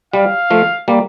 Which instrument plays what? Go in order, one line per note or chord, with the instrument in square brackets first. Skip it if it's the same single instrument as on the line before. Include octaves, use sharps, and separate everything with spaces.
[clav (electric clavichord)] G3 [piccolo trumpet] F5
[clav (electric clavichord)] F3 A3
G3 A#3